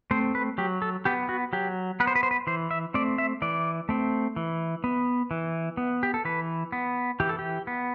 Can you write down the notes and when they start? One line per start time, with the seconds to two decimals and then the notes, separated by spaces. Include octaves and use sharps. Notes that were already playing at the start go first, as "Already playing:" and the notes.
0.11 A3 C4 C5
0.35 B4
0.58 F#3 G4
0.82 A4
1.05 B3 G4
1.29 F#4
1.53 F#3 G4
2.00 B3 B4
2.07 C5
2.16 B4
2.23 C5
2.31 B4
2.47 E3 C5
2.71 E5
2.94 A3 C4 D5
3.18 E5
3.42 E3 D5
3.89 A3 C4
4.36 E3
4.84 B3
5.31 E3
5.77 B3
6.03 G4
6.14 A4
6.25 E3 B4
6.72 B3
7.20 E3 G4
7.29 A4
7.39 G4
7.67 B3